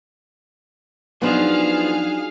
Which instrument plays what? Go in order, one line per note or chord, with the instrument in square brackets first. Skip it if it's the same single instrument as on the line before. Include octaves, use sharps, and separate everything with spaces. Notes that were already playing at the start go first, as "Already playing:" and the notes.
[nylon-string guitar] F3 B3 [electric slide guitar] F#3 D4 D#4 [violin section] G#4 F5